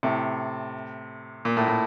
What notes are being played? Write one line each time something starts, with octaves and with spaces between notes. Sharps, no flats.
A2 C3
A#2
A2
A2